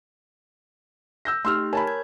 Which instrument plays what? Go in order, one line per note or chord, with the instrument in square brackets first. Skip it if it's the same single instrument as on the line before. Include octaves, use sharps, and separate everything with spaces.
[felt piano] E6 G6 A#6
[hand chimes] A3 D#4 G4 [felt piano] C6 E6 F6
[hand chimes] A#4 C#5 [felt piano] G#5 A5 B5
[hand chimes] G#6